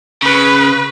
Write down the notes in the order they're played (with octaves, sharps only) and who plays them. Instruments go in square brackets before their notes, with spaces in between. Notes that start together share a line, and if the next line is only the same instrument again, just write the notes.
[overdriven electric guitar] C#3 [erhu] B4